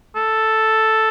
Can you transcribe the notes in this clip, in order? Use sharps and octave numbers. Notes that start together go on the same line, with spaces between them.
A4